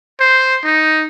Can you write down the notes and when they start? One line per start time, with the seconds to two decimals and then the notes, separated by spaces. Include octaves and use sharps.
0.20 C5
0.64 D#4